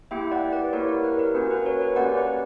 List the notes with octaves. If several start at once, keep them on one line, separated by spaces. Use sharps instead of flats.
A#3 E4 G4 E5 G5
D5 F#5
B4 D5
A#3 E4 G4 A#4 C#5
A#4
B4
A#4
A#3 C#4 F#4 B4
B4
A#4 C#5
B4
A#3 C#4 G4 D5 F#5
B4 D5